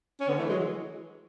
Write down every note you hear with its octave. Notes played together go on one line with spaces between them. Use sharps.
C#4
D3 B3
E3 A3
F#3 G#3
E3